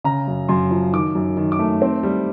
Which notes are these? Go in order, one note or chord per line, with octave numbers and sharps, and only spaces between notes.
C#3 A#5
F#2
F#2 C6
F3
D#3 D6
F#2
D#3
D6
A3
C4
G3